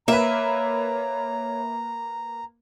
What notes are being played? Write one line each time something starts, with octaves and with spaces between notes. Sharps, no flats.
A#3 B4 C#5 E5 A#5